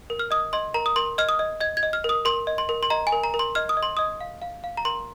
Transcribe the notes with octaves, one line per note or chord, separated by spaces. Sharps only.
A#4
F6
D#5 D#6
D#5 C6
A#4 A#5
D#6
A#4 C6
D#5 F6
D#6
D#5
D#5 G#6
G#6
D#5
F6
A#4 D#6
A#4 C6
D#5
C6
A#4
C6
D#5 A#5
G#5
A#4
A#5
A#4
C6
D#5 F6
D#6
D#5
C6
D#5 D#6
F5
F5
F5
A#5
A#4 C6